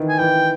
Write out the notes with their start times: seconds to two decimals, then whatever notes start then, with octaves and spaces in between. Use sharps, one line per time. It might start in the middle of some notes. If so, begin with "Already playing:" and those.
Already playing: D#3 E3
0.09 G#5
0.18 E3 G5